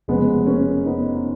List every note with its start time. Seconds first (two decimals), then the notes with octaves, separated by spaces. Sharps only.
0.08 F1 F2 C#3 G#3 B3
0.46 A#3 C#4
0.86 B3 D#4
1.15 D#4